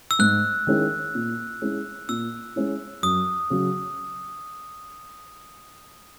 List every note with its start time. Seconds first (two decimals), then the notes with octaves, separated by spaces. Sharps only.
0.11 E6
0.19 G#2 F#6
0.67 D#3 G#3 C#4 E4
1.15 A#2
1.62 G#3 C#4 E4
2.09 A#2 E6
2.56 G#3 C#4 E4
3.03 F#2 D#6
3.50 C#3 F#3